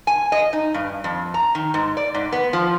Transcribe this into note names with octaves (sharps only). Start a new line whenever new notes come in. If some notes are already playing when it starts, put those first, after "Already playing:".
G#5
D#5
D#4
G2
F2
A#5
D#3
G#2
D5
G#2
B3
F3